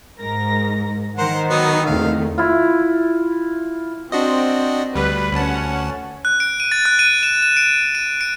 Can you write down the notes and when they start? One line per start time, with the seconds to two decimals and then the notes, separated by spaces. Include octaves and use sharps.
0.20 G#2 A#4 A#6
1.17 D#3 A#4 C5 F#5
1.50 F#3 B3 D#4 C#6
1.86 E2 A3 C4 F5
2.38 E4 F4
4.12 C4 D4 F#4 D#5
4.95 D2 G3 B4
5.33 D2 C#4 F#5 A5
6.25 F#6
6.40 D7
6.60 D#7
6.72 A6
6.85 F#6
6.99 D#7
7.23 E7
7.42 E7
7.57 D7
7.95 D#7
8.21 D7